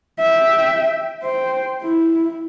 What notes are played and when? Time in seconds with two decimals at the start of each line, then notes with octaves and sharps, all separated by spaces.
0.19 E5 G5
1.23 C5 G5
1.82 E4